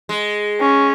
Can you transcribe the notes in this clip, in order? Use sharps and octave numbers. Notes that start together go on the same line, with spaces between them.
G#3
C#4